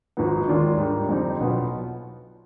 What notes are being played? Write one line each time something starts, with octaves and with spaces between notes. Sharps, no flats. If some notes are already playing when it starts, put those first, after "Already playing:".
G#1 G#2 F3 B3
D#2 D#3 G#3 D4 F4
G#2 D#3 G3
F2 D3 G3 C4 D#4
B1 B2 B3 F4